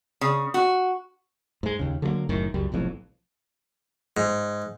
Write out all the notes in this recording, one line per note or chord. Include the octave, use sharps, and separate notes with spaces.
C#3
F#4
G#2 G#3
D#2 C#3
D3 F#3 G#3 A#3
F#1 F#2 A2 D#3
C#2 F#2 G3
F1 B1 F2 A2
G#2